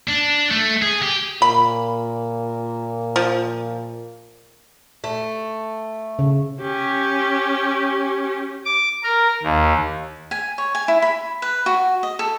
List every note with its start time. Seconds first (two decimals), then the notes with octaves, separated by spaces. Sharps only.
0.08 D4
0.51 A3
0.82 G#4
1.02 G4
1.42 A#2 B5
3.16 F3
5.04 A3
6.19 C#3
6.62 C#4 G4
8.65 D6
9.03 A#4
9.43 D#2
10.31 G#5
10.58 C#5
10.75 G#5
10.88 E4
11.02 B5
11.42 B4
11.66 F#4
12.03 D#5
12.19 A4